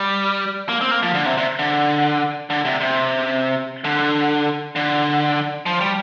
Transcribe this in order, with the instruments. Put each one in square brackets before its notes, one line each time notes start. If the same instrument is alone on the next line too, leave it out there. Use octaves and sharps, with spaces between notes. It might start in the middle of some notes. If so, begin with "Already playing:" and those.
Already playing: [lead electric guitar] G3
A#3
C4
A#3
F3
D3
C3
C3
D3
D3
C3
C3
D3
D3
F3
G3